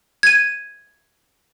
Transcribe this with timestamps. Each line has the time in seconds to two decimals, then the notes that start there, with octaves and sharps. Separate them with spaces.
0.23 G#6 D#7